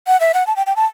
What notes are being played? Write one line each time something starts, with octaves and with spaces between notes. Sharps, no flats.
F#5
E5
F#5
A5
G5
G5
A5